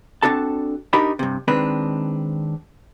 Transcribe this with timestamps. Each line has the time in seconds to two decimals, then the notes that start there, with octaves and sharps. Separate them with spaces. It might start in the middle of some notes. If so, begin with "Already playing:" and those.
0.23 C4 D4 F#4 A4 A5
0.93 D4 D#4 G4 A#4 D#5 B5
1.19 G2 C3
1.48 D#3 G#3 C4 D4 B4